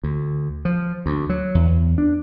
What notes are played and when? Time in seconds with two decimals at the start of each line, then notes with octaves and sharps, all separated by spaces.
0.03 D2
0.65 F3
1.06 D2
1.29 F#3
1.55 E2
1.98 D4